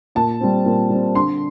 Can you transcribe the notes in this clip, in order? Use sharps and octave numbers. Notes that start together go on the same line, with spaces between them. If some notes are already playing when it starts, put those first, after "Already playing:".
A#2 A5
G3 C4
A#2
G3 C4
D3 C6